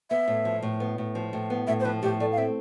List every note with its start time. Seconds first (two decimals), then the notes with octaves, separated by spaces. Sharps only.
0.10 B3 E5
0.28 A2
0.45 F3
0.62 A2
0.80 B3
0.98 A2
1.15 F3
1.33 A2
1.50 B3
1.67 A2 E5
1.80 C5
1.85 F3 B4
2.02 A2 G4
2.20 A3 D5
2.32 F5
2.38 C4 E5